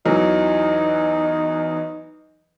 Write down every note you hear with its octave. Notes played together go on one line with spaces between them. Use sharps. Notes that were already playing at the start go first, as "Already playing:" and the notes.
E2 E3 F#3 D#4